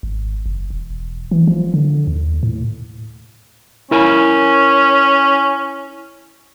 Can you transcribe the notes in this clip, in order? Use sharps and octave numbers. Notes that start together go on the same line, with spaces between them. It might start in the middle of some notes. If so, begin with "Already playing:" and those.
G#1
F#1
E1
E3
F3
D3
D#2
A2
C#4 E4 A#4 G#5